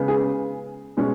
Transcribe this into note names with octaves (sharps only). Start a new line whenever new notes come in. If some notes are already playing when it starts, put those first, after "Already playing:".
Already playing: C#3 G#3 B3
G#4
B2 G#3 C#4